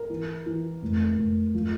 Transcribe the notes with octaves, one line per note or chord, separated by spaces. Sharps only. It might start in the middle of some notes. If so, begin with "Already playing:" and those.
Already playing: A#4
E3
E3
F1
F1
F3